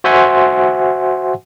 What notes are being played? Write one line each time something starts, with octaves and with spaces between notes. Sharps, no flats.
F#4 C5 E5 F#5 G#5 C6